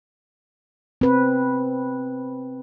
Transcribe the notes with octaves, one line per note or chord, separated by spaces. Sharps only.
C4 B4